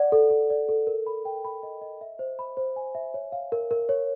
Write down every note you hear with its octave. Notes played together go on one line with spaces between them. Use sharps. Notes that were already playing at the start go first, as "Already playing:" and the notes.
Already playing: D5 F#5
A4
A4
D5
A4
A#4
B5
G5
B5
D#5
D#5
E5
C5
B5
C5
G#5
E5
C#5
F5
A#4
A#4
C#5